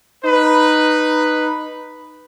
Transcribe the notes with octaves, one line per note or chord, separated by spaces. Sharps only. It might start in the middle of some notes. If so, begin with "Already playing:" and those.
D#4 B4